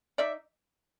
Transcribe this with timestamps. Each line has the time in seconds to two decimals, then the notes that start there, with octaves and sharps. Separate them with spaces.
0.18 D#4 D5 E5